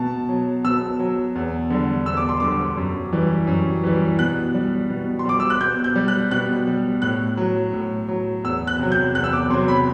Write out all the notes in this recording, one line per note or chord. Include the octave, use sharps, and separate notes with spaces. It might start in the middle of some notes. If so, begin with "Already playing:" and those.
Already playing: B2 A5
F#3
B2 E6
F#3
E2
D3 G3
E2 E6
D6
C6
D3 G3 D6
F#2
E3 G3
F#2
E3 G3
B2 F#6
G3
B2
C6
G3 D6
E6
F#6
B2 G6
G6
G3
F#6
B2 F#6
G3
A2 F#6
F#3
A2
F#3
E2 E6
F#6
C3 F#3
G6
E2 F#6
E6
D6
C3 F#3 C6
B5